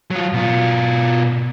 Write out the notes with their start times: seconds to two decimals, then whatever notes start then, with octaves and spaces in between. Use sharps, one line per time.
0.11 F#3 F4
0.33 B2 F4